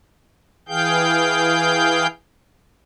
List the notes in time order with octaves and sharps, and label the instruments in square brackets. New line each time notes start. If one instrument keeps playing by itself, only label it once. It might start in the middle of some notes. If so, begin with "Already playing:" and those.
[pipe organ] E3 G#4 F5 G5 G6